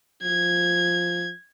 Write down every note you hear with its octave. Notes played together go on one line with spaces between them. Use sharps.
F3 G#6